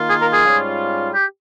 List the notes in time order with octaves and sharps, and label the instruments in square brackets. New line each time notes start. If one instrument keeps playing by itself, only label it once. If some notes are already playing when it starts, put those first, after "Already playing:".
Already playing: [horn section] D#3 A#3 F4
[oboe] G#4
A#4
G#4
[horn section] G#2 G3 C#4 F4
[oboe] G4